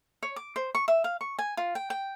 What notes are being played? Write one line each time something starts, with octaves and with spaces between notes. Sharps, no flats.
C#5
D6
C5
C#6
E5
F5
C#6
G#5
F4
G5
G5